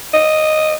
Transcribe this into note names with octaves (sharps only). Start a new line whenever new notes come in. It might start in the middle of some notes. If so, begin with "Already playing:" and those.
D#5